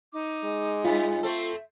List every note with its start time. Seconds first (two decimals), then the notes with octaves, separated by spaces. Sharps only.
0.12 D#4 D6
0.44 G#3
0.85 G2 F4 E5
1.23 A3 C4 A4 E5